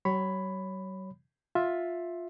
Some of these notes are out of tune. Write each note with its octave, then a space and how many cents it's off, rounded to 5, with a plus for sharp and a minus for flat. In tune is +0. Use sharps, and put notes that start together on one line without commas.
F#3 +45 C#5 +0 B5 +10
F4 +10 E5 +0